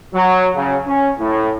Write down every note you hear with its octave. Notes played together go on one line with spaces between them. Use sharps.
F#3
C#3
C#4
A2